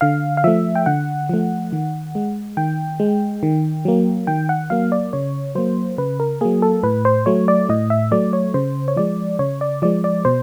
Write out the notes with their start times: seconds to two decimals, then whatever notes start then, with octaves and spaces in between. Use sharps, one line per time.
0.01 D3 F5
0.37 F5
0.44 F3 A3 E5
0.75 G5
0.86 D3 F#5
1.29 F3 A3
1.73 D#3
2.15 G#3
2.57 D#3 G5
3.00 G#3
3.43 D#3
3.85 F#3 A#3
4.27 D#3 G5
4.49 F#5
4.70 F#3 A#3 F5
4.92 D5
5.13 C#3 C#5
5.55 F#3 A#3 C5
5.98 C#3 B4
6.20 A#4
6.41 F#3 A#3 G#4
6.62 A4
6.83 A2 B4
7.05 C5
7.26 F#3 A3 C#5
7.48 D5
7.69 A2 D#5
7.90 E5
8.11 F#3 A3 D5
8.33 C#5
8.54 C#3 C5
8.88 C#5
8.96 F3 G#3 D5
9.39 C#3 C#5
9.61 D5
9.82 F3 G#3 D5
10.04 D5
10.25 B2 C5